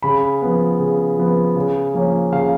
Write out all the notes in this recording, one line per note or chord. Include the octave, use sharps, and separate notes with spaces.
C#3 B5
F3 B3
C#3
F3 B3
C#3
F3 A#3 C#4
C#3 F5